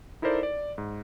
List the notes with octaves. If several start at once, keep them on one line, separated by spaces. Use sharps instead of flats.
D#4 E4 A4 A#4 C5 D5
D5
G#2